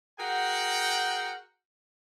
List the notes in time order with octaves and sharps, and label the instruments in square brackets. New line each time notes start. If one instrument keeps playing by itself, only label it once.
[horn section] F#4 G#4 A#4 F#5 G5